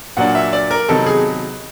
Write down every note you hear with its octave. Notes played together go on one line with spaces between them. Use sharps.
A#2 F#3 A#3 D4 F#5
E5
D5
A#4
C3 D#3 F#3 B3 D#4 A4
G#4